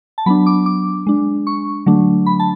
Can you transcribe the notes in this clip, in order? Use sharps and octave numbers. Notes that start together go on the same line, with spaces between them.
A5
F#3 B3 D4 B5
D6
D6
G#3 D4
C#6
D3 F#3 A3 D4
B5
A5